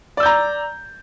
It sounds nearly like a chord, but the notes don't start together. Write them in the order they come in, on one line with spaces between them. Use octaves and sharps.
D5 E6 G6 A#5